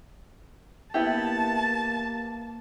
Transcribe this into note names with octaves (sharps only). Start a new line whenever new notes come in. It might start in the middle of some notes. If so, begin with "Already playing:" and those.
A#3 B3 E4 G4 A5